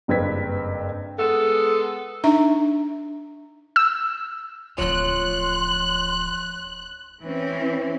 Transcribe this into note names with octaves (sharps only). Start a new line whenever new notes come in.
F#1 G2 C4 B4 G#6 B6
G#3 B3 A4
D4 D#4 E5 A#5
E6
D1 F3 F4 C#5 C6 F#6
E3 C4 C#4